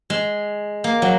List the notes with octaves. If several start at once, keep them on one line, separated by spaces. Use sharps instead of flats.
G#3
A#3
F#3